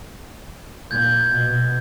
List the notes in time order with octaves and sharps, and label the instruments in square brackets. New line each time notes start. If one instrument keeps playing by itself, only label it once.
[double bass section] A#2 [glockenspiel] G6 G#6
[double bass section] B2